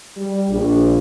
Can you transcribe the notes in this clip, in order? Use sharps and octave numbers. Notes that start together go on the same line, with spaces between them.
G3
A#1